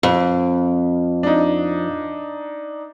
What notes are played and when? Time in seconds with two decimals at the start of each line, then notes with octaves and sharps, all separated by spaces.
0.03 F2
1.23 D4 D#4